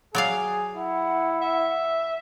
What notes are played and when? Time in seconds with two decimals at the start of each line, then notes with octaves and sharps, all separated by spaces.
0.15 F#3 G#4 D5 F5
0.75 E4 F#5
1.42 E5